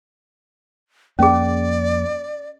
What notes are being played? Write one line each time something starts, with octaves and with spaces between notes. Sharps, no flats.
F2 A#3 C#4 G#4 D5